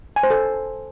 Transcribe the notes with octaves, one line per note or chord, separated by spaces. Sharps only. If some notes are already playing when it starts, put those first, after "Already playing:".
G#5
C5
A4